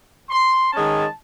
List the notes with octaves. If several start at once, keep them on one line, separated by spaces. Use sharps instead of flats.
C6
D#3 G#3 C#4 A5